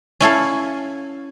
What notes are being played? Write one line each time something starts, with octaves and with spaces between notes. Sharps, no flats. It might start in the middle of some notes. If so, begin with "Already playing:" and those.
C#4 E4 A4 F5